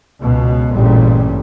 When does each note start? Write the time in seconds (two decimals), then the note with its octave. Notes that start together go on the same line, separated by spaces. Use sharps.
0.20 C#2 B2
0.73 A1 G2 A#2 C#3 G3